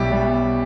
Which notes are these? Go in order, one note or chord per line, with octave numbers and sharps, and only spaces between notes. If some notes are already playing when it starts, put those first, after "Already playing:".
Already playing: B1 B2 G3 E4 G4
B2 G3